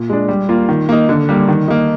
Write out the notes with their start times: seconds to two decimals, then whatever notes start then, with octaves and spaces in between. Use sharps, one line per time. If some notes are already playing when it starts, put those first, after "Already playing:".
Already playing: A#2
0.10 G#3 D4
0.28 G3
0.49 A#3 F4
0.69 D#3
0.89 A#3 D#4
1.09 D3
1.29 G3 A#3
1.48 D#3
1.68 A#3 D#4